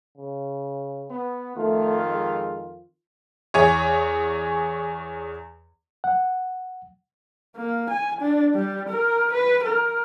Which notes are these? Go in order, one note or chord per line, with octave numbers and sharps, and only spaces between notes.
C#3
B3
F2 D#3 A3 F4
G#3
E2 G#4 C#5
F#5
A#3
G#5
D4
G3
A#4
B4
A#4